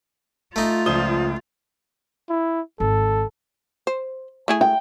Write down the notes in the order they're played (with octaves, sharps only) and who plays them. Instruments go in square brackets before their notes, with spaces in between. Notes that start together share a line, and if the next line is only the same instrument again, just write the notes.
[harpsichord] A3 D#4 [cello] F4
[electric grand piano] C#2 D5 [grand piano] F3 D#6 G7
[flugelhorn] E4
[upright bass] G#1 [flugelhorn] A4
[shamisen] C5
A3 E4 G#4
[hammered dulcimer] G5